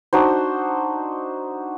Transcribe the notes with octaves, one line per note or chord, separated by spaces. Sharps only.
D4 D#4 F#4 C5